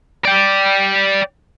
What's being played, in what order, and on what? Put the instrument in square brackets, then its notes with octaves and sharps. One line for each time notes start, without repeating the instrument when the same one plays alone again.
[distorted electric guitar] D5 G5